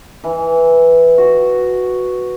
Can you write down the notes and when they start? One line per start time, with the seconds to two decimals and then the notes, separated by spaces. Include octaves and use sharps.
0.24 E3
1.18 F#4